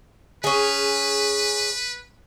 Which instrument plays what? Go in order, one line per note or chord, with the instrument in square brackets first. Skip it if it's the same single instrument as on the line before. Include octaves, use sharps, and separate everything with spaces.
[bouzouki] C#4 G#4 [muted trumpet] B4